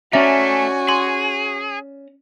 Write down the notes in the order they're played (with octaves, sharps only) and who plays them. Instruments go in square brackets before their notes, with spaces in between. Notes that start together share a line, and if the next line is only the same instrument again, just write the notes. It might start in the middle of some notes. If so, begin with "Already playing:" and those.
[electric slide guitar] A3 [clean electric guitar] C#4 D5 A#5 [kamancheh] F#4 G#5 [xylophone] E5
[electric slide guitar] G#4 [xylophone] C6